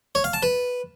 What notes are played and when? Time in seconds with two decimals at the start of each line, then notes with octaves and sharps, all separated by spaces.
0.15 C#5
0.24 F5
0.33 A5
0.43 B4